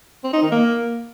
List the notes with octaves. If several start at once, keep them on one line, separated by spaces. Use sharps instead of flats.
C4
D#4
D#3
A#3